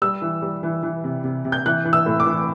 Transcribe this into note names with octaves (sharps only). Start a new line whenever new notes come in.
G3 E6
E3
G3
E3
E3
C3
C3
C3
G6
E3 F#6
E3
E6
A2
D6
E3